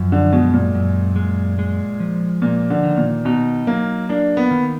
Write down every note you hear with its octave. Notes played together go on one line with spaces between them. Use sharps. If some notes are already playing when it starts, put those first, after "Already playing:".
Already playing: F#2 F3
D3
B2 G#3
A#2
F#2
G#3
G#3
F3
A#2 A#3
D3
D#3
A#2
B2 D#4
F#3 A#3
A#3 D4
B3
D#3